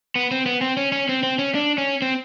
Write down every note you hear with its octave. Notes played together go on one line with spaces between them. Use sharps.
B3
C4
B3
C4
C#4
C#4
C4
C4
C#4
D4
C#4
C4